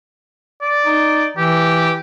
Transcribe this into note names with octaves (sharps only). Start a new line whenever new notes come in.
D5
D#4
E3 G4